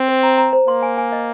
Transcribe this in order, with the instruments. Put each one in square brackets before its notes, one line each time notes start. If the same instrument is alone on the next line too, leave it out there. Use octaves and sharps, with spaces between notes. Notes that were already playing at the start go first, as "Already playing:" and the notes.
Already playing: [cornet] C4
[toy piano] C5
A#5
A#5
C5
[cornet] A#3 [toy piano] C6
[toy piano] G#5
G#5
D#5